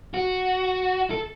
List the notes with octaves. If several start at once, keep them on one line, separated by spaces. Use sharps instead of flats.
F#4
A4